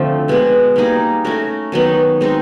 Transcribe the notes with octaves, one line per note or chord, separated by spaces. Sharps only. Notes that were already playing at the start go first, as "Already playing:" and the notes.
Already playing: D3 F3 A3 C4
B2 G#3 B3
G3 A#3 D#4 G#4
A3 C#4 F#4 A#4
D#3 F#3 B3 D#4
G#3 C4 D#4